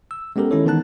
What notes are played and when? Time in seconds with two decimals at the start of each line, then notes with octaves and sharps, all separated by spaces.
0.11 E6
0.36 G#3 B3 C#4 G4 A4 A#4
0.51 D#3 G#3 C#4 E4 A4 C#5
0.65 D#3 E3 B3 D#4 A5 F#6